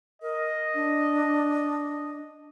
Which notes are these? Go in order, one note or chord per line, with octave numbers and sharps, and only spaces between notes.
A#4 D#5
D4